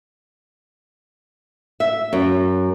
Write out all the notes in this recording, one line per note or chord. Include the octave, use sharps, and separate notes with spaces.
E5
F#2